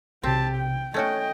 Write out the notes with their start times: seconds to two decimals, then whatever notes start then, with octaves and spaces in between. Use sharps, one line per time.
0.24 B1 C3 C4 G4 A5
0.57 G5
0.94 A3 C#4 F#4 C#5 D#5 G5 G#6